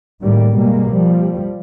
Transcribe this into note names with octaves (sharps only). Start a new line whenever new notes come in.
A2 D#3 G3 A#3
B2 G3 G#3 A#3
F3 G3